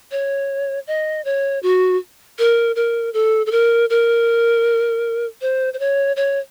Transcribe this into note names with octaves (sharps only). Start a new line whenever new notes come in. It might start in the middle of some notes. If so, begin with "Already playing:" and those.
C#5
D#5
C#5
F#4
A#4
A#4
A4
A4
A#4
A#4
C5
C5
C#5
C#5